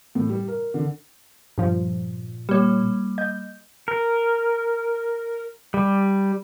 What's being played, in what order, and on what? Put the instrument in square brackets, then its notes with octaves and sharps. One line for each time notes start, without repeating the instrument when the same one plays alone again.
[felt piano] A2
G3
A#4
D3
[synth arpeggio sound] G2 F3 [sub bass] A#2
[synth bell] G3 A#3 [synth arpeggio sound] G4 C#5
[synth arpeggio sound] D#5 G6
[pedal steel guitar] A#4
G3